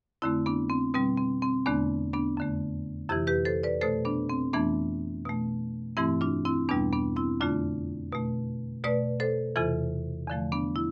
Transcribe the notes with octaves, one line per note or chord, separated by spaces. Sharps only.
F2 D3 A3 C4 E4
B3 D4
C4
B2 G3 C4
C4
C4
E2 D3 A3 B3 D4
B3 D4
F2 D3 A3
F2 C3 E3 E4 G4
G4 B4
A4 C5
B4 D5
B2 A3 A4 C5
B3 D4
C4
F2 E3 A3 B3 D4
B2 A3
G2 E3 A3 C4 E4
D4 F4
C4 E4
E2 B2 G3 B3 D4
B3 D4
C4 E4
F2 D3 A3 D4 F4
B2 A3
B2 A3 B4 D5
A4 C5
E2 C3 E3 F4 A4
E2 D3 F3 A3
B3 D4
E4